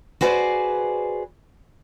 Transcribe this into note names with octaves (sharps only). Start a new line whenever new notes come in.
F#4 G#4 B4 C5 D5